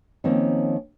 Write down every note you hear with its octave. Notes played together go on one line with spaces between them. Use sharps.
D#3 F3 A#3 C4 C#4